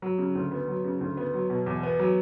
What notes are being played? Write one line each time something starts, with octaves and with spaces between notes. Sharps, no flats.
F#3
C#3
D2
B3
F#3
C#3
D2
B3
F#3
B2
E2
B3
F#3